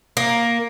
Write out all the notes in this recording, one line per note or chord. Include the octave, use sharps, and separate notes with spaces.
A#3